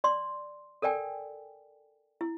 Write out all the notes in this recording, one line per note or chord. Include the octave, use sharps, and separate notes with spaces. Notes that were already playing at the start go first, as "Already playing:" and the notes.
D5 C6
A4 A#4 D5 G5 G#5
E4